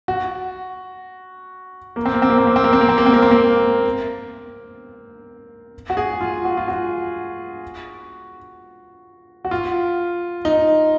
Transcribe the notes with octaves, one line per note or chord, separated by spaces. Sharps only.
F#4
A#3
C4
A#3
C4
A#3
C4
A#3
C4
A#3
C4
A#3
C4
A#3
C4
A#3
C4
A#3
F#4
G#4
F4
F#4
F4
F#4
F#4
F4
D#4